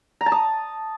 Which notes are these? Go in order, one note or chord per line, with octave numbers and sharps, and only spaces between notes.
A#5
A5
D#6